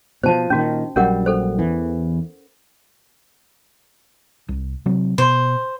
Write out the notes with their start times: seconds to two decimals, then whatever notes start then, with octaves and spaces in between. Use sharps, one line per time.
0.23 B2 E3 F3 C5 A5
0.50 A#2 D#3 C#4 F#4
0.96 A#1 F#3 G3 C#4 A#4 F#5
1.26 A4 C5
1.59 E2 E3
4.49 C2
4.86 C3 F#3 C4
5.18 B2 C5